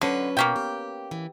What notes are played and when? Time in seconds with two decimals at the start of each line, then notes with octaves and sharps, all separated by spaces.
0.01 D3 F#3 C#4 B4
0.37 B2 A#3 C#4 G5
0.56 G4
1.11 E3